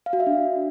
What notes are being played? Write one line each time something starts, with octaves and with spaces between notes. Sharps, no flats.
F5
F#4
E5
D4